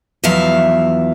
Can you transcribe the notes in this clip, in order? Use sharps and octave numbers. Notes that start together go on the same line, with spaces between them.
E2 F3 F#3 E5 F5